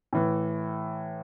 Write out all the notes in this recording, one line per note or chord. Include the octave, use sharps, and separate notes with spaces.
A2 E3